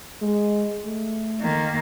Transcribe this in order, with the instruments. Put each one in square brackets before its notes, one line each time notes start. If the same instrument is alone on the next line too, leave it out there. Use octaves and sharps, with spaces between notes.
[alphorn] G#3
A3
[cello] D#3 A#3